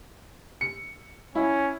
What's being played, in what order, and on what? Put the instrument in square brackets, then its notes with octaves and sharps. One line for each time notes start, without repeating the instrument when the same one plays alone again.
[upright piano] C#7
[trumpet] C#4 [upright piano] E4